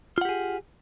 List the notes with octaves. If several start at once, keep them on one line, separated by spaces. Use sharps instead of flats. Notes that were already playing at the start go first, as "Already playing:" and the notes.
F4 G4 G#4 F#5